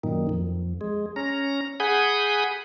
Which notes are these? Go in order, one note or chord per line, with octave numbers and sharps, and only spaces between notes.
F#2 A#2 D#3
F2
G#3
C#4 A#5
G#4 F#5 G#5 B5 D#6 G6